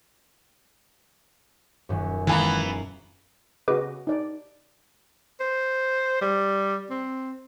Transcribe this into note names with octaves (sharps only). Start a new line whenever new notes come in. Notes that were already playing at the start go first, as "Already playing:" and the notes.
D#1 F#2
D#3 E3 G#3 B3 F5 G#5 A#5
C#3 F#4 B4 D#5 D6
D#4 D5
C5
G3
C4